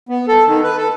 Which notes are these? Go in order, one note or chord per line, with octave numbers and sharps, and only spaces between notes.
B3
A4
D#3
B4
A4